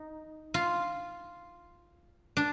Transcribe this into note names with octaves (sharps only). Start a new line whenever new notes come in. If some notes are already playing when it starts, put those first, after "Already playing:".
Already playing: D#4
F4
D4